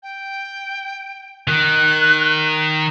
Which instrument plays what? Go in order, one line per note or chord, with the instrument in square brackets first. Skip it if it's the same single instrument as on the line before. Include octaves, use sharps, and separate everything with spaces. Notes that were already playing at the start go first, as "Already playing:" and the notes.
[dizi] G5
[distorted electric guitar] D#3 [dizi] F#6